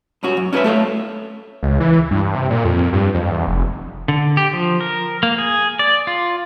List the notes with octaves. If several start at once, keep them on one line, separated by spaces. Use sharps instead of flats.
G2 C#4 F#4
F#2
C#4 D4 A#4 B4 E5
A3 A4 C#5 F5
C#2
E3
G2
C3
A#2
F2
G2
F2
E2
F1
D3
G4
F3
A#4
A#3
G#4
D5
F4